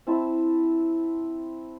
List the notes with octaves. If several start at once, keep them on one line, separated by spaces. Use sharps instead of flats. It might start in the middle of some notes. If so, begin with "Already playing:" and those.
C4 E4 A5